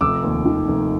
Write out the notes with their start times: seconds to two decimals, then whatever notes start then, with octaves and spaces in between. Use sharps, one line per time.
0.01 F1 D6 E6
0.23 D#2
0.45 D#3
0.68 F1